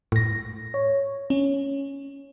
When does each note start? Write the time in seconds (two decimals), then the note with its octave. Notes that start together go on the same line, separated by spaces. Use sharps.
0.12 A2 A#6
0.74 C#5
1.30 C#4